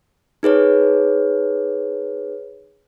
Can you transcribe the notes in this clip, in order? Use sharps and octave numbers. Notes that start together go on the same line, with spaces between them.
D#4 G#4 B4 C#5